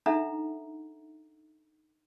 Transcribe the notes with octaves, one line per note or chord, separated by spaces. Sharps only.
D4 D#4 A4 E5 F#5 A#5